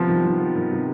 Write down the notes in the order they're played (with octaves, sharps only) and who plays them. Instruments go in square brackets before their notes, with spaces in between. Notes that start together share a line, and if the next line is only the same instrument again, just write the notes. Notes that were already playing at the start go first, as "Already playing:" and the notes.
Already playing: [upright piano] C3 B3 [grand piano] F3
[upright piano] D#3
D#3
B3
D#3
C3